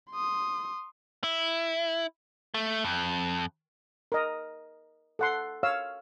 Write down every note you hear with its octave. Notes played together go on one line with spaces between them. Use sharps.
C6 D#6
E4
A3
F2
A#4 D#5
A4 F#5 C6
C#5 F5 E6